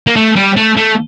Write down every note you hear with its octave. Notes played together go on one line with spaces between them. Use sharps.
A#3
A3
G3
A3
A3